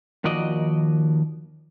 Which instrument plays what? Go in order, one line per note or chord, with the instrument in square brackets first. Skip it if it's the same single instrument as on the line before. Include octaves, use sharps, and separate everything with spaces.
[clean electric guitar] D#2 D#3 F3 F#4 D5 D#5